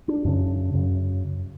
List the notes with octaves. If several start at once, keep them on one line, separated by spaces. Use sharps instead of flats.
D4
F#2 C#3
F#2 C#3